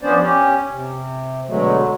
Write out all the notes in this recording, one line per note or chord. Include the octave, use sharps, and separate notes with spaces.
F3 B3 C#4 D4 C5 D5
C#4 G4
C3
B2 D3 F#3 G#3 A3